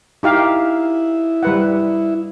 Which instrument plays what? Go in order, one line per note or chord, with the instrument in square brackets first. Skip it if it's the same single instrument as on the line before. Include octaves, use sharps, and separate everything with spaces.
[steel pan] D#4 G4 F5 [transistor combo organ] E4
[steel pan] G3 B4 F#5